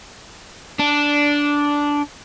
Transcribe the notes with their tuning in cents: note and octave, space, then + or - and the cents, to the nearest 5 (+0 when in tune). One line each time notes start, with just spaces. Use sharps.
D4 -10